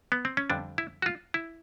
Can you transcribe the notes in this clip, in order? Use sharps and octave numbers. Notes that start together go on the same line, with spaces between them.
B3
C4
C#4
F2 D3 G3 D4
E4
F#4
F4
E4